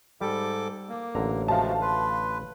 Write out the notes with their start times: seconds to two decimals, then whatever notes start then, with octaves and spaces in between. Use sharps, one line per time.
0.21 G#2 G3 A4 D6
0.89 A#3
1.15 A1 D3 A#5
1.48 F3 G#3 A3 F#4 F5 A5
1.81 B4 C6